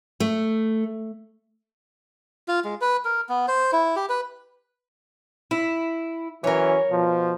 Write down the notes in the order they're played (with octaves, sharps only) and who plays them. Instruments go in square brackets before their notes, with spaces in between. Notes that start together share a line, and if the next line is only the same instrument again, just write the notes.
[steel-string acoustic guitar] A3
[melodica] F4
G#3
B4
A#4
B3
C5
E4
G4
B4
[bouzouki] E4
[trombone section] E3 F#3 C#4 [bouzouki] A#4 C#5
[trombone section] B2 F3